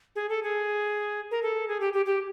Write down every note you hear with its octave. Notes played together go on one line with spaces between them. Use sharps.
G#4
A4
G#4
A#4
A4
G#4
G4
G4
G4